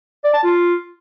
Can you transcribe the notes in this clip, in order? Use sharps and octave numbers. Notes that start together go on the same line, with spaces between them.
D5
A5
F4